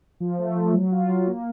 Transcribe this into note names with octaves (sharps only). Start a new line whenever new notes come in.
F3
A3
F3
F#3
F4
F#3
A#3